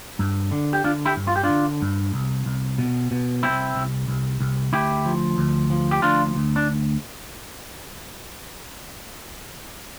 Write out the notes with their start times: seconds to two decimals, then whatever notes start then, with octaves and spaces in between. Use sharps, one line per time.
0.19 G2
0.51 D3
0.73 G4
0.84 D3 D4 F4
1.05 E4 G4
1.16 G2
1.27 F4
1.36 G4
1.43 D4 F4
1.49 D3
1.82 G2
2.14 C2
2.46 C2
2.78 B2
3.11 B2
3.43 C2 C4 E4
3.76 C2
4.08 C2
4.40 C2
4.73 D2 E4 G4
5.06 F3
5.38 D2
5.70 F3
5.91 G4
6.02 D2 D4 F4
6.35 D2
6.56 D4